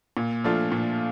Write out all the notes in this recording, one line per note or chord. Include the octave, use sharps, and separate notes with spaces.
A#2
F3 A3 D4 F4
A#2